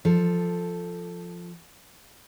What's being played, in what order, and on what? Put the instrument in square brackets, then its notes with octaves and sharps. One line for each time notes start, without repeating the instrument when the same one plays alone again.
[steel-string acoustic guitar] F3 A4